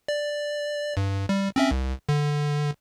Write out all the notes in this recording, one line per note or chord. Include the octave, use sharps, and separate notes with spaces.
D5
G2
G3
C4 C#4 E5
C2
D3